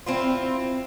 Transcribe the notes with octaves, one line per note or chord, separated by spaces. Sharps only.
C4 E4 F4